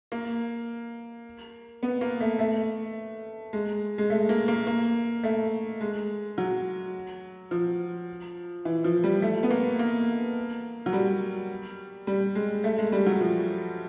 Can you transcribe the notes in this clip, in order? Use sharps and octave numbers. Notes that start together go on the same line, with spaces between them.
A#3
B3
A#3
A3
A3
G#3
G#3
A3
A#3
A#3
A#3
A3
G#3
F#3
F3
E3
F3
G3
A3
B3
A#3
A#3
F#3
G3
G3
G#3
A3
G#3
G3
F#3
F3